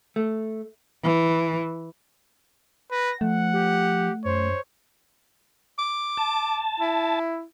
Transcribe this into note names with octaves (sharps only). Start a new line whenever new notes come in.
A3
E3
B4 A#6
F3 A3 F#5
G4
F#2 C5 C#5
D6
A5
E4